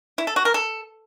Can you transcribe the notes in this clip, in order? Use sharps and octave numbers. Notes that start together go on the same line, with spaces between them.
E4
A4
F#4
A#4
A4